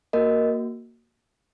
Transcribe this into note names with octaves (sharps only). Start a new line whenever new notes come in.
A#3 F#4 A#4 D#5